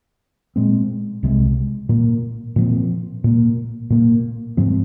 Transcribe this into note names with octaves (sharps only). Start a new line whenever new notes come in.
A#2 G#3 C4
C2 C3 G#3
A#2 A#3
A#2 F3 C4
A#2 A#3
A#2 A#3
G#2 F3 C4